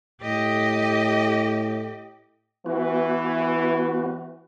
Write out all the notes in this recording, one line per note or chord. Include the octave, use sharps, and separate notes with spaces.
A2 G4 D#5
E3 B3 F#4